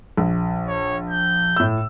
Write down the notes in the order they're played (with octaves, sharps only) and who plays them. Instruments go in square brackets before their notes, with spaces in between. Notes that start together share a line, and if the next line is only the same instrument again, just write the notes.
[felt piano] A#1
[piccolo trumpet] C#5
G6
[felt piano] A2 E6